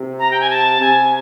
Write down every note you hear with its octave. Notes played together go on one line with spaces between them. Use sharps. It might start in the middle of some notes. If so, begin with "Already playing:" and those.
Already playing: C3
A#5
G5
G#5
A5
C3 G#5